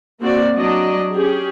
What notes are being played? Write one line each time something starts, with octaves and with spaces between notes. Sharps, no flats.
A#3 C4 F#4 D5
F#3 D4 D5 D#5
C#4 G4 G#4